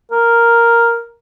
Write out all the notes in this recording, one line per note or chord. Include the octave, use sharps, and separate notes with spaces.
A#4